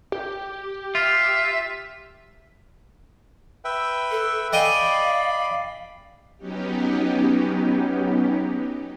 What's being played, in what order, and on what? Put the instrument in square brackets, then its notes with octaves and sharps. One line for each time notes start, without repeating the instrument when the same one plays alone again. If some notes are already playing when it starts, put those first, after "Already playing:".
[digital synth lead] G4
[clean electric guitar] F4 [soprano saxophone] E5
[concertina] B4 E5 G5
[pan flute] A4
[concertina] D5 B5 [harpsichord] D#5 G5 G#5 [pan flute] F5
[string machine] F#3 B3 C#4 D#4 G4